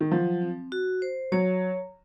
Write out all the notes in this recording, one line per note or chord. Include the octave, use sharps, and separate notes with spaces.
D#3
F3 F#3
C4
F#4
C5
F#3 C#5